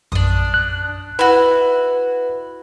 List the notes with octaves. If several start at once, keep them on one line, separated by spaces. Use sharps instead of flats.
A#1 F#2 D4 D#6
F#6
E4 F#4 B4